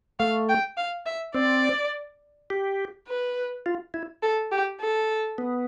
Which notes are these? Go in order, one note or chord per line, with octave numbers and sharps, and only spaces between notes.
A3 F5
G5
F5
E5
C4 D5
G4
B4
F4
E4
A4
G4
A4
B3